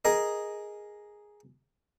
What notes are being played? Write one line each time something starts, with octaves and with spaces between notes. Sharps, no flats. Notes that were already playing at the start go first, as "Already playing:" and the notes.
G#4 A#4 D#5